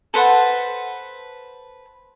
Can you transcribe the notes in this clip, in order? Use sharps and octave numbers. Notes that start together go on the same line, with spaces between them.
A4 B4 C5 F#5